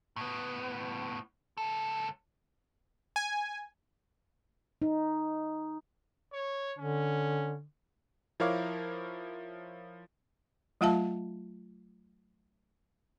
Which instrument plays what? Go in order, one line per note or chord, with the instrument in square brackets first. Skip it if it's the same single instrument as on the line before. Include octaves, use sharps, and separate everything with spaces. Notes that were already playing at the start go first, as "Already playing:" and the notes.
[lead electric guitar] A2 B3
C#2 A4
[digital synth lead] G#5
[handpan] D#4
[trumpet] C#5
[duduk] D3 [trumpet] C#4
[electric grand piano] F3 E4 A#4 C#5 F5 D6
[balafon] F#3 A3 F4 E5 F5 A5